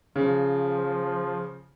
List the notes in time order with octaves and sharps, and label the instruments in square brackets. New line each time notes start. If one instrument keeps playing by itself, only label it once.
[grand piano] C#3 [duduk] F3